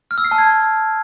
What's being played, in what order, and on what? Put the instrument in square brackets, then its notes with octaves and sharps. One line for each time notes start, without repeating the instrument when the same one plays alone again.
[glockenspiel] F6
E6
C7
A5
G#6